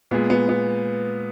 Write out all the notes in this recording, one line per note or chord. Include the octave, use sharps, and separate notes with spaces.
A#2 G#3 B3
B3
B3